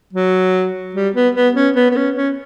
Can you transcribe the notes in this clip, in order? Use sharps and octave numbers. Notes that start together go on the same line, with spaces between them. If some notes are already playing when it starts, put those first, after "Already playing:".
F#3
G3
B3
B3
C#4
B3
B3
C#4
C#4